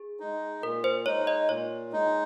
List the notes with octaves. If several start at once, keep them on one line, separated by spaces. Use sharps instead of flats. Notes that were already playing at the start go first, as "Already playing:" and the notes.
Already playing: G#4
G#3 D#4
A#2 A#4
C5
G#3 D#4 C#5
D#5
A#2 C#5
G#3 D#4